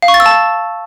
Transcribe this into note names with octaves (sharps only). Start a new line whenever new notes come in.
F5
C#6
A6
E6
A5